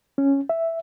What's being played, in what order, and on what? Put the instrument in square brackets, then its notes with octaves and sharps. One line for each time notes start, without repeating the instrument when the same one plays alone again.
[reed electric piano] C#4
E5